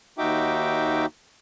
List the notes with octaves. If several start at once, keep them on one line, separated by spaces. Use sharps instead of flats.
D#2 D#4 F#4 E5 G5 D6